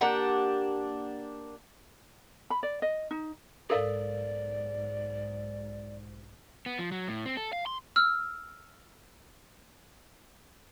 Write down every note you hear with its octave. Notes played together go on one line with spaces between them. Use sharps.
A#3 D4 G4 F#5
B5
D5
D#5
D#4
B1 G#2 A4 A#4 D5 F5
B3
F3
F#3
A2
C4
A4
F5
C6
E6 F6